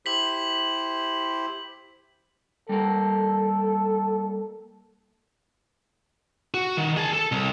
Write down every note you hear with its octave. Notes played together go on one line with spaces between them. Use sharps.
E4 G4 C5 B6 F#7
G3 A#3 A4 A#4
F#4
D#3
G#4 A5
A4
C2